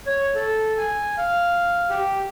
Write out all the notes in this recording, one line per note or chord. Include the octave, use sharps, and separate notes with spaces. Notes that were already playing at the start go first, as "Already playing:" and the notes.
C#5
A4
G#5
F5
G4